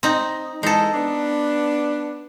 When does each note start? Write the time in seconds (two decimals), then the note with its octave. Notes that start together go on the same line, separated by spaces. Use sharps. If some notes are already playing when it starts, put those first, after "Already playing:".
0.03 C4 D#4
0.63 E3 G#3 D#4 A4
0.95 B3 D4